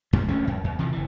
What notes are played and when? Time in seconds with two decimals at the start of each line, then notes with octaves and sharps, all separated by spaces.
0.13 F2 G#2 C3 G3
0.28 D#1 D2 A3 C#4
0.47 F#2
0.64 E2
0.79 C3 E3 F3
0.92 F#1 E3